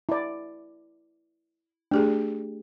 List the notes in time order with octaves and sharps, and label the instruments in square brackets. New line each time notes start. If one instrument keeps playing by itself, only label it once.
[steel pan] E4 D5
[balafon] A3 G4 G#4 [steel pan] D4